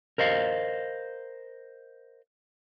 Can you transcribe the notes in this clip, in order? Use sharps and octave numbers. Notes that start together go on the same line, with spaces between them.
A#4 C5 D#5 F5